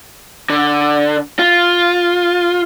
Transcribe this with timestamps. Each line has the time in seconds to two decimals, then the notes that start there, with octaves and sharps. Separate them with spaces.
0.50 D3
1.39 F4